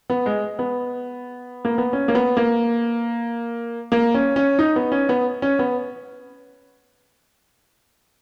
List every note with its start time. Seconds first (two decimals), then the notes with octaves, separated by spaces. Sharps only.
0.10 B3
0.26 G#3
0.59 B3
1.65 A#3
1.78 B3
1.93 C#4
2.08 A#3
2.15 B3
2.37 A#3
3.92 A#3
4.14 C#4
4.36 C#4
4.59 D#4
4.76 B3
4.92 C#4
5.09 B3
5.42 C#4
5.59 B3